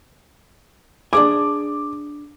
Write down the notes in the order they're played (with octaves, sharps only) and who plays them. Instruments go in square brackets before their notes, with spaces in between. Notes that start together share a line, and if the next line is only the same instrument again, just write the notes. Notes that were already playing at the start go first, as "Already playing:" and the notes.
[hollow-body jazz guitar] D4 G#4 G#5 [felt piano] D6